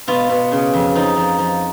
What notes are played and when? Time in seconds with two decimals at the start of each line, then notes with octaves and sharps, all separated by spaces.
0.08 B2 F4
0.29 B2
0.52 C#3
0.74 F2
0.95 F3 D#4
1.17 F3
1.39 F3